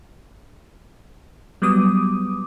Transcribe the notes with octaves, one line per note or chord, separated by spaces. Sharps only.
F#3 G3 B3 D6 D#6